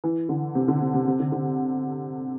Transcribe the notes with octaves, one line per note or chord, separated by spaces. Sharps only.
E3
D3
C3
D3
C3
C3
C3
D3
D3